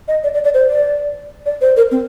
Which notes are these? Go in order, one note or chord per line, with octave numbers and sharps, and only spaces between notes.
D#5
D5
D5
D5
C5
D5
D5
C5
A#4
C4